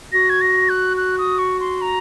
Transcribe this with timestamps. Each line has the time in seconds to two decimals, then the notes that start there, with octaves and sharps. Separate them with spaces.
0.12 F#4 A#6
0.30 G#6
0.41 A#6
0.69 F#6
0.97 F#6
1.18 D#6
1.39 C#6
1.60 C6
1.82 A#5